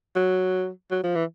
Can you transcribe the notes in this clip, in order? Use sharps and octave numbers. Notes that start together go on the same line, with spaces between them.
F#3
F#3
F3
E3